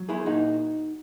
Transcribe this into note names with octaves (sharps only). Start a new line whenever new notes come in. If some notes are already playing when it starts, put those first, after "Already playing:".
Already playing: F#3
E4 G#4
A#2 D#4 F#4